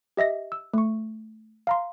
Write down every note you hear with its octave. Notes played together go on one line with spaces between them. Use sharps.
G4 D#5 E5 A#6
E6
A3 C#6
F5 A#5 C6